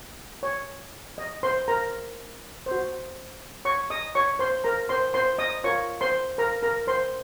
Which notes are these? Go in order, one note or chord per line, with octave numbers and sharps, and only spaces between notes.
C#5
D#5
C5 C6
A#4 A#5
C5
F#4
C#5 C#6
D#5 D#6
C#5 C#6
C5 C6
A#4 A#5
C5 C6
C5 C6
D#5 D#6
F4 A#4 C#5 C#6
C5 C6
A#4 A#5
A#4 A#5
C5 C6